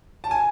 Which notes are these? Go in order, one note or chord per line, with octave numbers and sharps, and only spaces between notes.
A5
G#5